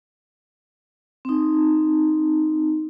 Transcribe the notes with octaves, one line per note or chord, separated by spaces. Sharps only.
C4 D#4